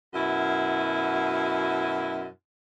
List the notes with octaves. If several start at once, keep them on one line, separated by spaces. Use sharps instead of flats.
F#2 B2 E4